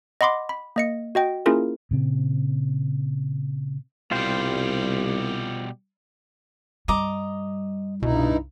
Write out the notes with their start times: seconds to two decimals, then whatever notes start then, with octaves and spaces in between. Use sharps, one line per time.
0.21 D#5 F#5 B5 C6 D6
0.49 B5
0.76 A#3 D#5 C#7
1.15 F#4 D#5 G5
1.46 A#3 C#4 E4 F4 G#4 A#4
1.91 A#2 C#3 C4
4.11 C2 B2 G3 F4 C5 G5
6.88 G2 G3 D#5 A#5 D6
8.02 C2 G2 B2 D#4 E4